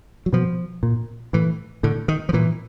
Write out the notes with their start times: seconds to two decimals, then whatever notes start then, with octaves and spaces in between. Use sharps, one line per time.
0.26 F#3
0.33 B2 F3
0.83 A#2
1.33 A2 E3
1.83 A2 D3
2.08 D#3
2.29 F3
2.33 A#2 E3